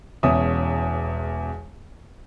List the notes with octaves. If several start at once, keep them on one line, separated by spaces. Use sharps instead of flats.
E1 E2 C#4 E5 D#6